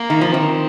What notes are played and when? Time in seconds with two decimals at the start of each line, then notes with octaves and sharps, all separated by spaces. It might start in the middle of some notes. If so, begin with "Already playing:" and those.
Already playing: A#3
0.10 D#3
0.21 F3
0.32 D#3 C4